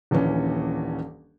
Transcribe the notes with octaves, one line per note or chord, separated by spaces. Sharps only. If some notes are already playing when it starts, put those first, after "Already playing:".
D#1 A#1 E3 C#4